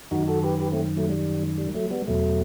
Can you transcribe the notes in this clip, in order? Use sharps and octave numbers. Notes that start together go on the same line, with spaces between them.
F#2 D#3 D#4 F#4
F#4 A4
G4 B4
G4 B4
A3 C4
F#3 A3
G3
G3
F#3 A3
G3 B3
E2 B2 F#3 A3